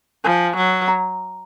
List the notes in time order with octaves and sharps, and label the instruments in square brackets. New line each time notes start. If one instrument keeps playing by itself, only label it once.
[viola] F3 [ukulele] G#5
[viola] F#3
[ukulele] A#5